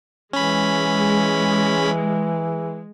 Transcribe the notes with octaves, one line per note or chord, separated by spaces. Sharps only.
E3 G#3 C#4 B5